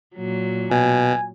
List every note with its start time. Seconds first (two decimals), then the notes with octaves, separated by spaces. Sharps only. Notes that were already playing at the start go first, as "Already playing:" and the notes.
0.15 A#2 F#3
0.71 B2 G#5